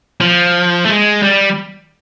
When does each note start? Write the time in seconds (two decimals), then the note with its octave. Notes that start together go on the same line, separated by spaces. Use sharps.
0.21 F3
0.85 A3
0.89 G#3
1.23 G3